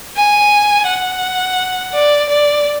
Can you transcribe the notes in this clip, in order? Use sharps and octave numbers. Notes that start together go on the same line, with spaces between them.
G#5
F#5
D5
D5